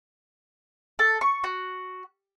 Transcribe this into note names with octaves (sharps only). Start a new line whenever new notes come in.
A4
C#6
F#4